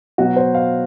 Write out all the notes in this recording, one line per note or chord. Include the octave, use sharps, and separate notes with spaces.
B2 F#3 F#4
C5
F5